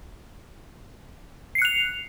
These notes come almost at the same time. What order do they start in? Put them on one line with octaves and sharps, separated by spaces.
C7 C#7 F#6 F7